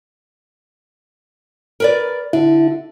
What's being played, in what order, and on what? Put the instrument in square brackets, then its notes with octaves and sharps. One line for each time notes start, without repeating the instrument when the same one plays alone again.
[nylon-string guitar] A#4 B4 D5
[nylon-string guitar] D3 [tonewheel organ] E4